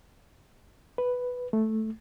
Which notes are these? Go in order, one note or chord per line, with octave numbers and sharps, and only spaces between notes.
B4
A3